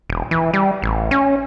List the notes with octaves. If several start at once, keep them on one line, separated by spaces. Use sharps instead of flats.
E1
E3
G3
A1
C#4